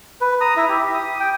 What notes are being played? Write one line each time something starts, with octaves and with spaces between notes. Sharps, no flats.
B4
A#5 D#6
E4 E5
G4
D#6
G5